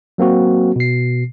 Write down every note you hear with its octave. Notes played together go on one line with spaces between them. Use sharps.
F#3 A#3 C4 F#4
B2 C7